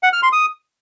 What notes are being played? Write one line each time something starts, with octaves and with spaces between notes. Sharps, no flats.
F#5
F6
C6
D#6